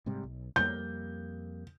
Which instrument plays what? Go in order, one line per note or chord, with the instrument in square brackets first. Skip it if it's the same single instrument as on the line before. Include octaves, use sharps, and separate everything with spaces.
[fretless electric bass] G#2 C3 G3
B1
[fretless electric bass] F2 G3 A#3 [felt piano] G6